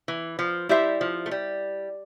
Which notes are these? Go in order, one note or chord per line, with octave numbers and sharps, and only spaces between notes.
E3
F3
G3 E4 G4 C5 E5
F3
A3
G3